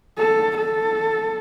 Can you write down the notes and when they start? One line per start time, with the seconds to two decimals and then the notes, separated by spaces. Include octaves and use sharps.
0.18 A4
0.57 A4